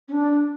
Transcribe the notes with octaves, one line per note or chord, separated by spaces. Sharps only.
C#4
D4